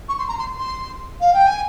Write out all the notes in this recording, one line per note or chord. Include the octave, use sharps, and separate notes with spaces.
C#6
C6
A#5
C6
C6
F5
G5
G#5